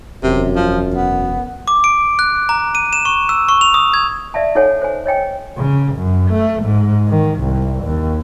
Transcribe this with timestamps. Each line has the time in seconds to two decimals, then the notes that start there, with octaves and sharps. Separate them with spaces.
0.23 E1 F#2 C3
0.56 F3
0.94 B3
1.68 D6
1.84 D7
2.19 F#6
2.49 A#5
2.75 D#7
2.93 E7
3.05 C#6
3.29 E6
3.48 C#6
3.61 F7
3.74 D#6
3.94 G#6
4.34 D5 E5 F5 A5
4.55 D#4 A4 C#5 F#5 G#5
4.82 C5 G#5
5.06 C#5 D#5 G5 G#5
5.57 C#3
5.96 F#2
6.29 A3
6.64 G#2
7.09 D#3
7.40 C2
7.84 D#2